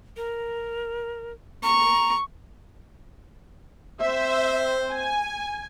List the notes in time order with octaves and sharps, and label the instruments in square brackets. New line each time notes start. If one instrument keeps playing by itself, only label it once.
[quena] A#4
[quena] A#5 [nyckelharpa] C#6
[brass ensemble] C4 C5 [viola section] E5
[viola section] G#5